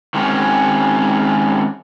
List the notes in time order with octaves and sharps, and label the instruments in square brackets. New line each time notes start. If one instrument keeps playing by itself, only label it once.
[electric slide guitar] D#3 G#3 C4 C#4 F#4